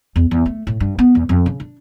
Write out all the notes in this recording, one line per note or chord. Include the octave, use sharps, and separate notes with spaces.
E2
E2
A3
A2
G2
B3
E2
F2
C#3
D4